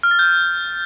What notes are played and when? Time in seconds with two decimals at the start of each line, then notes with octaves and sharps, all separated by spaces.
0.03 F6
0.11 A6
0.19 G6